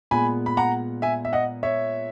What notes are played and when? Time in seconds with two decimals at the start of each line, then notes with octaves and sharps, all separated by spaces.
0.11 A#2 G#3 B3 G#5 B5
0.46 B5
0.57 F#5 A#5
1.02 E5 G#5
1.25 E5
1.33 D#5 F#5
1.63 C#5 E5